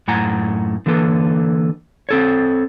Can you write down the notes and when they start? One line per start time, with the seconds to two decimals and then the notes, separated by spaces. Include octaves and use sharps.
0.08 F#2 A2 F#5 G#5 A#5
0.86 D3 E3 A#3 A4 B4
2.09 C4 A4 C#5